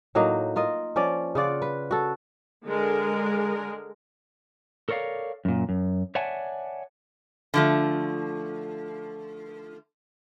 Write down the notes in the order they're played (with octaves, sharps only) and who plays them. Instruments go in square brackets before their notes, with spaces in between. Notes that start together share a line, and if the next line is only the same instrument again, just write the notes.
[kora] A2 F#3 A#3 D#4
F4 A#4 D#5
F3 C#4 D5
C#3 F4 D5 F#5
B4
F#4 A4
[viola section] D3 G#3 A#4
[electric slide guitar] A4 A#4 C#5 D5 F5
F#2 A#2
F#2
C#5 D5 E5 F#5 G#5 A5
[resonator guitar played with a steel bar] D3 F3 A3